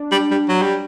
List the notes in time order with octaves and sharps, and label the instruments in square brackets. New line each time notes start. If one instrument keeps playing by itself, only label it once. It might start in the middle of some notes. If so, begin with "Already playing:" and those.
Already playing: [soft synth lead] D4
[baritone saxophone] G3
G3
F#3
G3